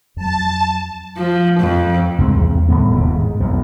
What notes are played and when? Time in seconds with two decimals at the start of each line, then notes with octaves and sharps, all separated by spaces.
0.17 F2 F#3 A5
1.17 F3
1.60 F2
2.18 C2 G#2 C4
2.38 E2
2.69 C2 A2 D3 B3
2.90 D#1 D#2 C3
3.10 G#2
3.40 B1 F2